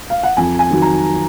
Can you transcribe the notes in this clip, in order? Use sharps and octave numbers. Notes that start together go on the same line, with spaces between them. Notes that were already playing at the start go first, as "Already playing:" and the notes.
F5
F#5
F2 G#5
G#5
D#3 F#3
A#5